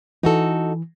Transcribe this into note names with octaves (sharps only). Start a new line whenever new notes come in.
E3 D#4 F#4 A4